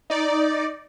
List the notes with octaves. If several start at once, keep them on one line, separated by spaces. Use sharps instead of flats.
D#4 D5